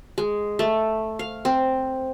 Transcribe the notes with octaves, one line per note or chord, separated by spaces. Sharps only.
G#3
A3
F5
C4